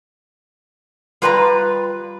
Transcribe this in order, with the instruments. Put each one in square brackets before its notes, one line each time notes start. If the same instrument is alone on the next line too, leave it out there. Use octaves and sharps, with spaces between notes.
[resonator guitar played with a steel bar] G3 F4 B4 G5 A#5